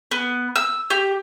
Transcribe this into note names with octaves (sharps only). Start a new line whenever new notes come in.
B3
E6
G4